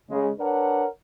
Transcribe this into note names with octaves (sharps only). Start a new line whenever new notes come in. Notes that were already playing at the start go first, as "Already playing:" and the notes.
C#3 G#3
D4 A#4 B4 C#5 F#5